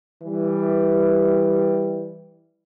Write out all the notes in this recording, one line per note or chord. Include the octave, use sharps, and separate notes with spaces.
E3 G3